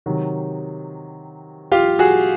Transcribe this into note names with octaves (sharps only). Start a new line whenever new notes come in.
C3 D#3 F#3
F4 G4
F#4 G#4